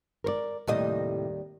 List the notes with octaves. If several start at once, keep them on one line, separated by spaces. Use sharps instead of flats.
A#4 C5 D5
D#2 A2 C3 G3 D#5